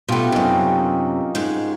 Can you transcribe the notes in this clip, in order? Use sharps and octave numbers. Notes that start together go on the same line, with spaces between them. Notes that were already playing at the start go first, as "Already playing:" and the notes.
B2 A3 F4 G4 B4
F#2 C3 C#4 D#4 A#4
G#2 G#3